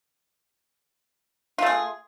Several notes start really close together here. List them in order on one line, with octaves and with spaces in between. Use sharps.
F4 A3 G#4